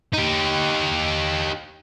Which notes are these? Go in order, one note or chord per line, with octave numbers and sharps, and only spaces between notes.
D#4 G4